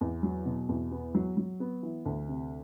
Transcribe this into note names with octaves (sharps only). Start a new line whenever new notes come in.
E2
F#3
B2
E2
B3
F#3
F#3
B3
E3
D2
C3